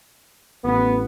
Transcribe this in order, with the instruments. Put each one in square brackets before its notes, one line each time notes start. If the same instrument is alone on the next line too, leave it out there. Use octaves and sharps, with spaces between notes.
[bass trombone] A1 [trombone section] B3